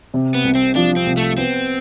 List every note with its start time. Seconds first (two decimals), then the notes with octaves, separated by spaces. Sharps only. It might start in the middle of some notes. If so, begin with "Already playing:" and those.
0.14 C3
0.35 B3
0.44 C2
0.55 C4
0.75 F3 D4
0.96 C4
1.07 C2
1.17 A3
1.38 B3 C4